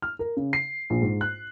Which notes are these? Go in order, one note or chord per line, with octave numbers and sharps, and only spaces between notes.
F6
A#4
C#3
C7
A#1
G#2
F#6